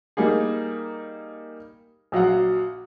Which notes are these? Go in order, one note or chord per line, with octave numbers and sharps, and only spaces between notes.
G3 A#3 D#4 G#4
A#1 F#3 F5 F#5